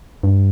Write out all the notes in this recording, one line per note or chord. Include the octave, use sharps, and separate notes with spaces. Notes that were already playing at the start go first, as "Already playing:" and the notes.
G2